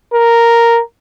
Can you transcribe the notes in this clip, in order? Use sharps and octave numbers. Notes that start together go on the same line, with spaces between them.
A#4